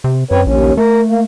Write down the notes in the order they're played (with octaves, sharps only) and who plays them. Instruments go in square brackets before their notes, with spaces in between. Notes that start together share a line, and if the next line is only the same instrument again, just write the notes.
[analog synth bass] C3
[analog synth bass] F#2 [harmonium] C4 B4 C#5
[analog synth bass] A#1 [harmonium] D#2 C#4
[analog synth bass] A3 [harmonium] A#4
[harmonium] A#3